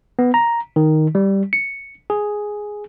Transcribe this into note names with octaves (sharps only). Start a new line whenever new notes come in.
B3
A#5
D#3
G3
C#7
G#4